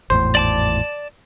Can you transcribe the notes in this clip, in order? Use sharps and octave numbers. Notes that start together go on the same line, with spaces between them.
G#1 E2 A2 C5
D5 A5 D6